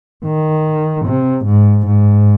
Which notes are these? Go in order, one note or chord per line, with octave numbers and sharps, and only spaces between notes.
D#3
C3
G#2
G#2